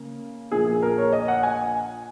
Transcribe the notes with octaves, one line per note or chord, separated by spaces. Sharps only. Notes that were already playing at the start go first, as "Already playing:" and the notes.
Already playing: C#3 A#3
A#1 A#2 A#3 G#4
G#4
A#4
C#5
D#5
F#5
G#5